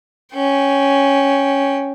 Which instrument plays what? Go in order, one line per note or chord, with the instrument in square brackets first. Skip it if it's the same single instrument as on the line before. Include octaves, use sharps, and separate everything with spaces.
[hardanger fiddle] C#4 G5